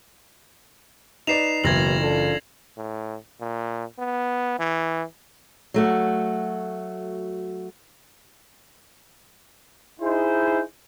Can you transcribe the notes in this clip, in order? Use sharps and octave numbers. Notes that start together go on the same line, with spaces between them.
D#4 B4 D5 C7 E7 F7
F#1 C#2 F#2 B2 E3 G#6 A#6 F#7
D4 F4 A4
A2
A#2
B3
E3
F#3 A3 F#4
D#4 E4 G#4 C5